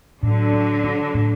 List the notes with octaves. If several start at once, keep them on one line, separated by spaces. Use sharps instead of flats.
A2 D3 F#3
D4
D4
A2